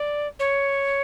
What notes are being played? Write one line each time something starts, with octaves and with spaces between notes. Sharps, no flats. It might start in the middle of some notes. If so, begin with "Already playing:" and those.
Already playing: D5
C#5